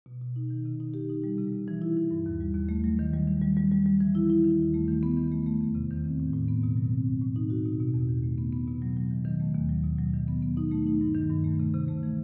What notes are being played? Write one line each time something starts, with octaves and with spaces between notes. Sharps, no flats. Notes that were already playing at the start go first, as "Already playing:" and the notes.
B2
B2
D#4
D#3
C3
D#4
G4
D#4
G3
C3
C3
E3
E4
E3
G2
D#2
G3
D#2
A3
F#3
D#3
G3
D#3
G3
G3
G3
G3
E3
E4
E4
D#3
D#2
A3
D#3
B3
D#3
A3
A3
E2
C3
D#3
C4
A2
A2
B3
B2
F#3
C4
A2
A2
D#4
F#4
B2
B2
E2
D#3
A3
B3
B3
B2
F#3
F#3
D#3
D#3
A3
D#2
F#3
B2
F#3
D#3
B3
B3
D#4
A3
D#4
G2
D#3
G2
A3
C3
C3
A3
E3